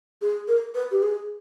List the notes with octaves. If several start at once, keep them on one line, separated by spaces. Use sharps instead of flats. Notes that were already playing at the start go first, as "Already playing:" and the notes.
G#4
A#4
B4
G4
G#4